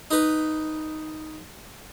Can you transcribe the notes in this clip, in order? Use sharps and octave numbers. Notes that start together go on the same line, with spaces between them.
D#4 B4